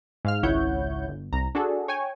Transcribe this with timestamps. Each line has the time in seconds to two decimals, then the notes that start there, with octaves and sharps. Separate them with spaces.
0.25 G#2 F5 F6
0.43 G#1 C#2 E4 C#5 F#5 G6
1.08 G1
1.33 C2 A#5
1.55 D4 F#4 G#4 A4
1.88 C#5 G5 G#5